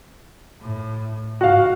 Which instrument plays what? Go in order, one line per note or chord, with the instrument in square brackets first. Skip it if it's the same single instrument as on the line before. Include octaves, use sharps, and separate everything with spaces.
[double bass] A2
[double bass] G#2 [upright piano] F#4 F5